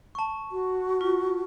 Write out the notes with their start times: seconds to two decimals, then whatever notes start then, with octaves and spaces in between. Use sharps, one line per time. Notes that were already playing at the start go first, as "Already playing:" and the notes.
0.15 A5 C#6
0.52 F#4
1.01 F4